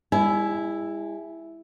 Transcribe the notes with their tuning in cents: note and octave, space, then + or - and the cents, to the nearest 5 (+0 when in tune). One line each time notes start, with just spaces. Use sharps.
G#3 -40 E4 +0 G#5 +30